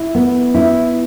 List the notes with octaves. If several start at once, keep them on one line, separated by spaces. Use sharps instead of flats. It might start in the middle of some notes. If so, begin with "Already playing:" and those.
Already playing: E4
B3
E4